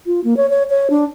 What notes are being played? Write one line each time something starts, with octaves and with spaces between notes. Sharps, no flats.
F4
A#3
C#5
C#5
C#5
D4